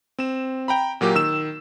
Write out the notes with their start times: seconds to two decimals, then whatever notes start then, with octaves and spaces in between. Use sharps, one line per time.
0.19 C4 E7
0.68 G5 A#5 B5
1.01 A#2 F#3 A#3 G4
1.15 D#3 E6 E7